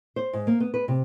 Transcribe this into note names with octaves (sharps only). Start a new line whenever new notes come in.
C5
G#2
A#3
B3
B4
C3